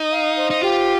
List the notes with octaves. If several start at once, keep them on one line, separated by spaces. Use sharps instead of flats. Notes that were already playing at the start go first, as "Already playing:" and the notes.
Already playing: D#4
F5
C5
D#4
F4 G4